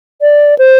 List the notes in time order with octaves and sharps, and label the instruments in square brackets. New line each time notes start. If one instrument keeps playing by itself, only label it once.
[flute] D5
C5